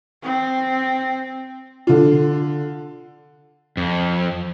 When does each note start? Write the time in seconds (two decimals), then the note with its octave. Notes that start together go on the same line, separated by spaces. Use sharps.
0.23 C4
1.87 D3 F4
3.77 F2